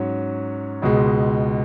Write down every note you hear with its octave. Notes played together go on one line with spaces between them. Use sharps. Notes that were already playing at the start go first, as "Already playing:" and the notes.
Already playing: G#2 F#3 C#4
C#2 B2 G#3